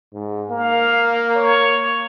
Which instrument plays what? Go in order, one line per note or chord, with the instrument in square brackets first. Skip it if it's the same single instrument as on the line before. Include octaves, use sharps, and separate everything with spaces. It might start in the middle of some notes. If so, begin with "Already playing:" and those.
[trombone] G#2
[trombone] A#3 [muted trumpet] F5
[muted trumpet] C#5